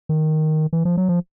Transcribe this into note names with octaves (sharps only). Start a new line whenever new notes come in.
D#3
E3
F3
F#3
F3